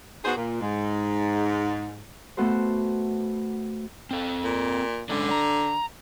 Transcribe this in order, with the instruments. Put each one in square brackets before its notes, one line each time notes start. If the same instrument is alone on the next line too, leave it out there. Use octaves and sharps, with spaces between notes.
[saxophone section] B3 D#4 F#4 G#4 C5
A#2
G#2
[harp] A3 B3 F#4 A4 C5
[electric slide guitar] C4 A4
[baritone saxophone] A#2
[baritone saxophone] D3 [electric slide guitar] G#3 C#4 D4
[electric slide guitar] A#5